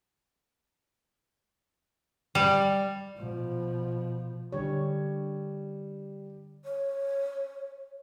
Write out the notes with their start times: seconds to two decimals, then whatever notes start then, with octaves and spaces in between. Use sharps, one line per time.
2.35 G3
3.17 B2 F3
4.52 D3 G3 C#5
6.64 C#5